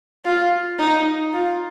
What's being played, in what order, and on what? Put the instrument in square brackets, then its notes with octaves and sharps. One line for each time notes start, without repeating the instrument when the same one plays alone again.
[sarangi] F4
D#4
F4